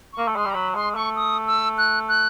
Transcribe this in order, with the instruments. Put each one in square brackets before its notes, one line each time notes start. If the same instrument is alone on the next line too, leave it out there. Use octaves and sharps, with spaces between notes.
[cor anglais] A#3 [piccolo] C#6
[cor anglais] A3
[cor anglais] G#3 [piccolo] C6
[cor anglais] G3
[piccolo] A#5
[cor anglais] F#3 [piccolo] B5
[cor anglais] G#3 [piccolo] C6
[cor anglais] A3 [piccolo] C#6
[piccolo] D#6
E6
F#6
F#6